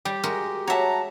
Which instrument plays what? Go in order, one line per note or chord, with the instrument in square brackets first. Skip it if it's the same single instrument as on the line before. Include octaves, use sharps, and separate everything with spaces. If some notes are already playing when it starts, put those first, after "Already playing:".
[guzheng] G3 [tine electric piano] G4
[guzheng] G#3 F#4 A#4
[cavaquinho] F#4 A5 [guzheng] C#5 E5 [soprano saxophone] A#5